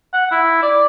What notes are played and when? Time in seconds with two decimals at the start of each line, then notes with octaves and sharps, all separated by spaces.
0.13 F#5
0.31 E4
0.63 D5